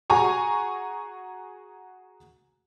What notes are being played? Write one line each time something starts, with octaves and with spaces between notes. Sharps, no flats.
F#4 G#4 G#5 A#5 C#6